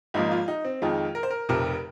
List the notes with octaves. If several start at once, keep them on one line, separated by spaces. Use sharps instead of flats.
G#1 G#2 F3 A#3 D#4
F4
D#4
C4
F2 D#3 G#3 F4
A#4
C5
A#4
F1 F2 C3 A#4